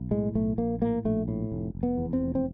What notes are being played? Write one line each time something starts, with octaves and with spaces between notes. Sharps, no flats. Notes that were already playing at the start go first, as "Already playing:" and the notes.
Already playing: B1
A2 G#3
B1 A3
A#1 A#3
A2 A#3
A#1 A3
A2
F1
F1
B3
E2
C4
F1
C4